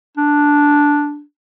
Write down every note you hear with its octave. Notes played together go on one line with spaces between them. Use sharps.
D4